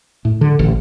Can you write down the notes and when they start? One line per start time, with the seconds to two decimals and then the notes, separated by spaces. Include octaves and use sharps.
0.25 A2
0.41 D3
0.59 A1